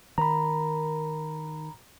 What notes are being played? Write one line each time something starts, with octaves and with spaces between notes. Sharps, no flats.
D#3 A#5 B5